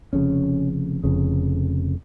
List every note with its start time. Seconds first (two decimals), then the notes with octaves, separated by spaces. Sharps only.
0.13 F1 F2 C#3 C#4
1.04 F1 F2 C#3